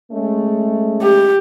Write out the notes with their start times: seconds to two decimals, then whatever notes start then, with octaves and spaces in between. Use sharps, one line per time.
0.12 G#3 A3 C#4
1.01 G4